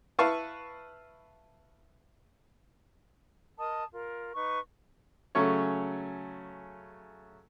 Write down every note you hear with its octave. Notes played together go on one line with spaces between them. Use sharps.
E4 B4 F5 A5 C#6
A#4 D#5 A5 D#6
F4 A#4
D#4 B4 C#6
C#3 F#3 A3 C#4 C#5